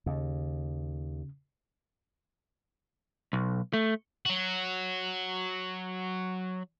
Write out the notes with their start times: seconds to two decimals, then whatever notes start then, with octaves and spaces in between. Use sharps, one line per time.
0.06 D#2 C#3
3.33 B1
3.73 A3
4.26 F#3 F#4